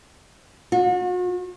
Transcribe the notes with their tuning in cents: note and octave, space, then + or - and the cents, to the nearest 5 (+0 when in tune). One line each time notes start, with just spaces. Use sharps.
F#4 -40